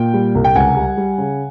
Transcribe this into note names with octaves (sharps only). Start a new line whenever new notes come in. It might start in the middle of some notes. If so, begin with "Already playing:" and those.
Already playing: A#2 G5
G3
C2
G5
C#2 F#5 G#5
G3
G3
C#3